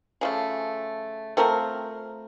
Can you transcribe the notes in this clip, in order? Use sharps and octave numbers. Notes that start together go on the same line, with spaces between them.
C#3 F3 A3
A3 C4 F4 A#4